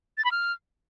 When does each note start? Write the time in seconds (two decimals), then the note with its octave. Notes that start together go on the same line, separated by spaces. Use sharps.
0.18 A6
0.24 B5
0.31 F6